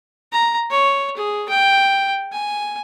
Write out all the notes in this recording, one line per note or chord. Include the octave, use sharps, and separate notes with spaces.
A#5
C#5
G#4
G5
G#5